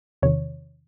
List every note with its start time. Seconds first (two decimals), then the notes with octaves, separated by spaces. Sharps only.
0.22 E2 C3 D#3 C#5